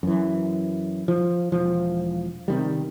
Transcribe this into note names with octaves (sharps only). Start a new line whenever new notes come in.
F#2 E3
F3
E1 F3
C3 D#3 G3